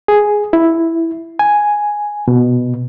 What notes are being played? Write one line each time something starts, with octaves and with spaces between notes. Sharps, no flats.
G#4
E4
G#5
B2